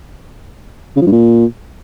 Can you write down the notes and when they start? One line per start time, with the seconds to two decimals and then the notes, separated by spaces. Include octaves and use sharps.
0.96 C#3
1.02 F3
1.07 G2
1.12 A#2